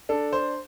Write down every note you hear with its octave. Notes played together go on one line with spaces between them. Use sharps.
D4 A4
C5